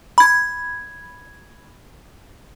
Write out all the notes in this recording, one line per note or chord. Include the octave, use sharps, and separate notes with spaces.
B5 G#6